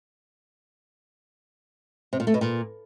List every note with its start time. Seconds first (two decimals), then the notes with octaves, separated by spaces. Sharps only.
2.13 C3
2.20 A#2
2.27 A3
2.34 B2
2.41 A#2